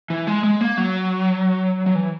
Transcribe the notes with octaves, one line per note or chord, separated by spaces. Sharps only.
E3
G#3
G#3
A#3
F#3
F#3
E3